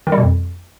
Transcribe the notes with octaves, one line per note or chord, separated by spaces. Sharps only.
D#3
G3
B2
F2